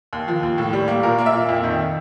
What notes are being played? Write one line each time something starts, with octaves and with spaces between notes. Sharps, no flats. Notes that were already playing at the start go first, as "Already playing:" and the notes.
D#2
F3
D#2
A2
G3
A#3
A#2 A#4
A#3
E5
A#2
F2
D#3